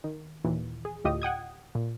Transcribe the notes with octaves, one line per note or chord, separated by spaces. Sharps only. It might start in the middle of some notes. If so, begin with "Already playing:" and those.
D#3
D#2 A#2 E3
G#4
D2 A2 F4 G4 D#5 D#6
F#5 G5 D#6 G#6
A#2